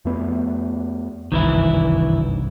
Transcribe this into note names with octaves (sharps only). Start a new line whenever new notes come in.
F2 A3 B3
F#1 C2 G2 D#3 E3 E4